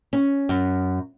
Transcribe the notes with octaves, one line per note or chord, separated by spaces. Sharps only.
C#4
F#2